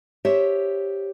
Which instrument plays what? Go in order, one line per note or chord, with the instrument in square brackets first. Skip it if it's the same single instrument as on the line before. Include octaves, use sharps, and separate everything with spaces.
[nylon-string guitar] G4 C5 C#5 E5